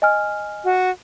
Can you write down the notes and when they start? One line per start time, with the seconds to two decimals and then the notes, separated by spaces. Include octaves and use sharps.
0.02 D#5 G#5 F6
0.65 F#4